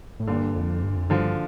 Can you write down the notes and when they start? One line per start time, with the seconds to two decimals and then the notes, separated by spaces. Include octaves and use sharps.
0.19 A2
0.27 G2 A#2 D3
0.55 F2
0.83 G2
0.96 F2
1.10 G2 D3 F3